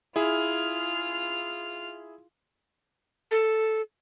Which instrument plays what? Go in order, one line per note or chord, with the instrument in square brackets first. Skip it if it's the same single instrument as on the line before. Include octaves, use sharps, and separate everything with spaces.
[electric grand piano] E4 G#4 [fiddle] F4 F6
[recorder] A4